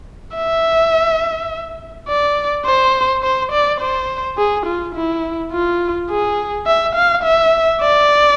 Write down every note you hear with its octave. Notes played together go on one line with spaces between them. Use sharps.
E5
D5
C5
C5
D5
C5
G#4
F4
E4
F4
G#4
E5
F5
E5
D5